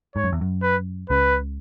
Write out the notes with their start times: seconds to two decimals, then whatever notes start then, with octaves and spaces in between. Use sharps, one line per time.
0.16 G#2 C#5
0.24 F#2
0.32 E2
0.41 F#2
0.62 B4
1.10 C#2 C#3 B4